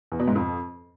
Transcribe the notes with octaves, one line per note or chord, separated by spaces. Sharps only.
E2
B2
G#2
F2